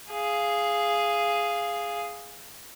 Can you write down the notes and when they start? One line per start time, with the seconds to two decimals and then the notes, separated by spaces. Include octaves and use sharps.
0.11 G#4 F5